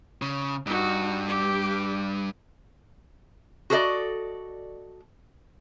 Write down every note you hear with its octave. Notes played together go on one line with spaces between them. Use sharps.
C#3
G2 D#4 F#4
G4 D6
F#4 G#4 A4 B4 D5 D#5